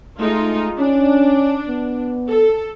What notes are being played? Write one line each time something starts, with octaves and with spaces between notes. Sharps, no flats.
G#3 A3 D#4 F4
C#4 D4
B3
A4